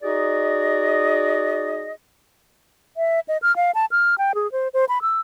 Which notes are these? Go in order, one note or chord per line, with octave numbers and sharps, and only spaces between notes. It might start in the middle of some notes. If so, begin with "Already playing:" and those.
D#4 F#4 G#4 D5 D#5
E5
D#5
F6
F5
A5
F6
G5
G#4
C5
C5
B5
E6